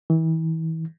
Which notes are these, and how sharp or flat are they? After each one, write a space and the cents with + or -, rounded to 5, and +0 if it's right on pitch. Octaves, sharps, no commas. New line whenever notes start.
E3 -35